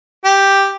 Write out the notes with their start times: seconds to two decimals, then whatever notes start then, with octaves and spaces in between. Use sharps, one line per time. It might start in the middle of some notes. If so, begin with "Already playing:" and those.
0.25 G4